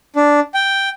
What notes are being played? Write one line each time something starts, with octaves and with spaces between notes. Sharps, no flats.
D4
G5